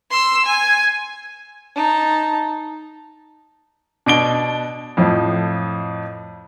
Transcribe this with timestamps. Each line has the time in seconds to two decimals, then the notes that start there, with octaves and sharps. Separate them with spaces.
0.11 C6 E6
0.46 G#5
1.75 D#4 A5
4.06 B2 D4 D7 G7
4.97 F2 A2 F3